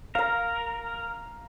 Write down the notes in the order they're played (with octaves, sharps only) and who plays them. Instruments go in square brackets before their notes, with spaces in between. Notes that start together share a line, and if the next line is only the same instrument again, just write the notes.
[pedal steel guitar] A#4 [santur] F5 A#5